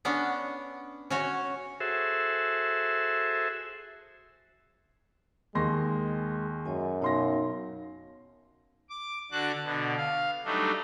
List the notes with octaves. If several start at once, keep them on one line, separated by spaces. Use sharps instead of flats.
B3 C#4 D4 F#5
C#4 F#4 C#5
F#4 G#4 A4 C5 E5
D#2 G#3 C6 A#6
F#2 C#5 D#5 G#5
B2 D#4 C#5 F5 C6 A#6
D6
D3 D4 F#4 D6 F#6
B2 D3
F5
F#3 G3 A3 D4 D#4